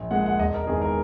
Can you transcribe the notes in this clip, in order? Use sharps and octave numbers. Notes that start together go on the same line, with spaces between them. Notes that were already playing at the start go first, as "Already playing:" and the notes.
Already playing: A#1
A#2 G#3 F#5
F#5
E1 D#5
A#4
E2 D#3 G#4
A#4